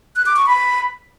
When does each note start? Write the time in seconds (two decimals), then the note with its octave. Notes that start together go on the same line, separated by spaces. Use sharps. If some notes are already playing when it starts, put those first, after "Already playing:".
0.16 F#6
0.26 D6
0.36 C#6
0.47 B5